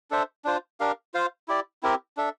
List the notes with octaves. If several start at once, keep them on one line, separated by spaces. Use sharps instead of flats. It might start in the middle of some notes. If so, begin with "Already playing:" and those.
D4 A4 C5 E5
D4 F4 C5
D4 G4 A#4 F5
F4 C5 F5
E4 G4 D5
C4 E4 G4 A#4
D4 A4 E5